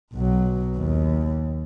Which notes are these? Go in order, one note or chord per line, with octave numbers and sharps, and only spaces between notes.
B1 F#3
D#2